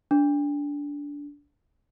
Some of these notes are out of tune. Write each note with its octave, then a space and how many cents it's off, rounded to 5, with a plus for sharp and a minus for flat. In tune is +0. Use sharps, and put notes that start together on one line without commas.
D4 -20